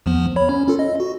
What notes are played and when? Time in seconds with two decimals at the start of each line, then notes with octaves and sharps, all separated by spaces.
0.06 E2 F3 B3
0.36 C#5 B5
0.49 C#4
0.67 C#4 F4 A4
0.79 D#5
1.00 F#4